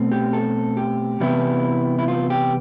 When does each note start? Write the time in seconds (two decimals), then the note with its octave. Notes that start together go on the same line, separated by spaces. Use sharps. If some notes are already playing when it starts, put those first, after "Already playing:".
Already playing: B2 A3 C4
0.12 G4
0.33 A4
0.77 G4
1.20 C3 E3 G3 B3 E4
1.99 E4
2.08 F4
2.30 G4